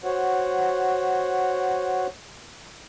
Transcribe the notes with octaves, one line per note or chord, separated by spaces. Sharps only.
F#4 C5 C#5 F#5